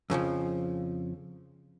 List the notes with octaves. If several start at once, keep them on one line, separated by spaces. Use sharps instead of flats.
F2 C#3 E3 F3